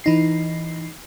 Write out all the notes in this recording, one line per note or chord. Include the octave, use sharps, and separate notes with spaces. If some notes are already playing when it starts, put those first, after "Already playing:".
E3 D#4 C7